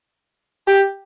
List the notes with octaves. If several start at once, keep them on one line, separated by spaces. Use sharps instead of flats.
G4